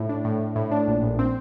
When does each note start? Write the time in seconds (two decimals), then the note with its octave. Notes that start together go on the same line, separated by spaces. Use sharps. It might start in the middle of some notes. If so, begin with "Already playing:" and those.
Already playing: A2
0.09 D4
0.25 A2
0.41 A2
0.56 A2
0.72 D4
0.88 A#1
1.02 A#1
1.19 C4